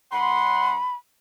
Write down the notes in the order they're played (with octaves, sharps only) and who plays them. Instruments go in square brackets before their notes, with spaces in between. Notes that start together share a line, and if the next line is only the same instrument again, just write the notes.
[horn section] F#2 F#5 C6 [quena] B5